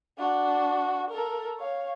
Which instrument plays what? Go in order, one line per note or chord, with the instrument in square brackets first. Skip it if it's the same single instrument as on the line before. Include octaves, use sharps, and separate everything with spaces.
[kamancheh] D4 F#4
A4 A#4
C#5 F5